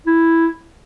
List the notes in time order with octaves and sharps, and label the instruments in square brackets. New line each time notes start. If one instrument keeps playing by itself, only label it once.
[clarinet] E4